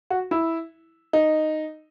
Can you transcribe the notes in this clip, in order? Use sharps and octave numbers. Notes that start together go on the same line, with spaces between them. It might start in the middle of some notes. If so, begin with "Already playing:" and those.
F#4
E4
D#4